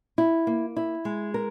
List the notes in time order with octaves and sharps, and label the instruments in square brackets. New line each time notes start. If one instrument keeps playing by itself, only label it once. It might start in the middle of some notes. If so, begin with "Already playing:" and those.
[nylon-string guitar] E4
A#3
E4
G#3
A#4